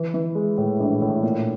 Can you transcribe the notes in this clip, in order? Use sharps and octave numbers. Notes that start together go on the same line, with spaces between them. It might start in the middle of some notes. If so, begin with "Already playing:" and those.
Already playing: E3
E3
G#3
A2
A#1
A2
A#2